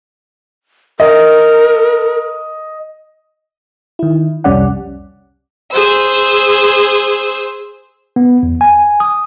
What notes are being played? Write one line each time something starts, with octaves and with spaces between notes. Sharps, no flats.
A#4 D#5
D#3 E4
C2 F2 G3 C#4 D5 F#5
G#4 C5 E6
B3
E2
G#5
D#6